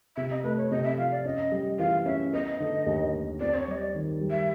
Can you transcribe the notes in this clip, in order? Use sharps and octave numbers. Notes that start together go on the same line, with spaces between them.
C3 E5
D#5
A3 B4
C#5
C3 D#5
E5
F3 F5
D5
C#4 D#5
G3
E3 F5
C#4 E5
B3 D#5
D3
D#2
D#2
C4 D5
C5
C#5
G3 D#5
D5
D#3
G3
E5